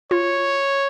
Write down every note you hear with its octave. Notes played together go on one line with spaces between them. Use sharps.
F4 C#5